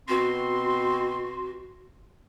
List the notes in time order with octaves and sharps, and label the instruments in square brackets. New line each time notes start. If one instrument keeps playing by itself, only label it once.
[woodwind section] B2 C4 C6 [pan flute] F#4